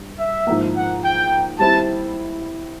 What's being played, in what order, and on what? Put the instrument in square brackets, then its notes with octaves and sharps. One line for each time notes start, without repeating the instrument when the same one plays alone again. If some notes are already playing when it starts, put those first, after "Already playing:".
Already playing: [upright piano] G2
[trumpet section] E5
[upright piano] G#2 F3 A#3
[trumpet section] F#5
G5
[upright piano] G3 C4 E4 [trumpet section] A5